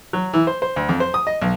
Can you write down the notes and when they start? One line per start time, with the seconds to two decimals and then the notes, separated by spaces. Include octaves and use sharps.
0.13 F#3
0.34 E3
0.47 C5
0.62 C5
0.76 D2
0.89 F2
1.00 C5
1.14 D#6
1.27 D#5
1.42 B1